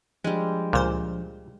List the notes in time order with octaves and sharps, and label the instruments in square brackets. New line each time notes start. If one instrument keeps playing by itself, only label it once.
[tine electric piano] F3 D4 [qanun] G3 G#3
[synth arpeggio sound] C#2 C#3 C5 [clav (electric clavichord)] A#2